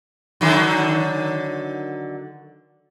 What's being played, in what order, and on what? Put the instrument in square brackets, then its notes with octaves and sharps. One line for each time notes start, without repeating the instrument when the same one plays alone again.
[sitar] D3 D#3 F#3